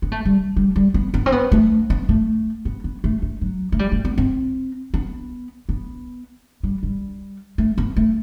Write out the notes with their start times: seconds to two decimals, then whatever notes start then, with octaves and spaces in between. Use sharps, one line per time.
0.02 B3
0.12 A3
0.25 G3
0.56 G3
0.76 G3
0.94 B3
1.14 B3
1.26 C4
1.32 B3
1.52 A3
1.90 B3
2.09 A3
2.65 B3
2.84 B3
3.04 A3
3.22 A3
3.41 F#3
3.72 A3
3.79 G3
3.92 A3
4.05 B3
4.18 C4
4.94 B3
5.69 B3
6.63 G3
6.83 G3
7.58 A3
7.78 B3
7.96 A3